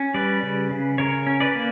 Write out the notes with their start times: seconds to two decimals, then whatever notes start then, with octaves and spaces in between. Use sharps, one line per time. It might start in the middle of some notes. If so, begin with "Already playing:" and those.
Already playing: C#4
0.14 G3 B4 D5
0.43 C#3
0.71 C#3
0.98 C#3 A#4 C#5
1.27 C#4
1.40 B4 D5
1.55 A#3